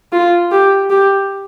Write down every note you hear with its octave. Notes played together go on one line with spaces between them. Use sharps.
F4
G4
G4